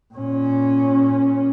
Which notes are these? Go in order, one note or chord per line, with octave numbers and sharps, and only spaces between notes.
A#2 C#4